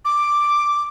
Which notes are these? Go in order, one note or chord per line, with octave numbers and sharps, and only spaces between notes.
D6